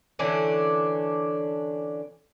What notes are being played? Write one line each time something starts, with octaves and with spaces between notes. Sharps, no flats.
D3 E3 C#4 D4